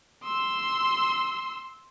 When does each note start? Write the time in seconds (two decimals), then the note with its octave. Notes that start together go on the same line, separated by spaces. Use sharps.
0.24 C6 E6